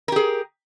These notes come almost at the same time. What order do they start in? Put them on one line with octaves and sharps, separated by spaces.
A#4 G4 G#4